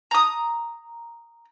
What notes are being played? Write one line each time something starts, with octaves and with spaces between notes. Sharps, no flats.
A#5 D#6